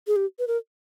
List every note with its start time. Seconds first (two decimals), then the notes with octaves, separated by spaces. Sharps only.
0.07 G#4
0.16 G4
0.39 B4
0.48 A#4